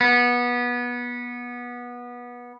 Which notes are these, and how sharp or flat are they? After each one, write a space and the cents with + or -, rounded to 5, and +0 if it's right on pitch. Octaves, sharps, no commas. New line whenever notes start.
B3 -20